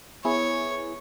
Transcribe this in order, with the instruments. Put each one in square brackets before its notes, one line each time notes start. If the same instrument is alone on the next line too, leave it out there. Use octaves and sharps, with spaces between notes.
[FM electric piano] B3 E4 G#4 [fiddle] C#5